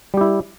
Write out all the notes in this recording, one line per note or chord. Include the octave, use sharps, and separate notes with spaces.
G3 E4 G4